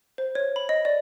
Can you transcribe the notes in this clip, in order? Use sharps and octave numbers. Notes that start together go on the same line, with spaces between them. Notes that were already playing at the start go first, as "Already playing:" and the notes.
C5
C#5
B5
D#5
D5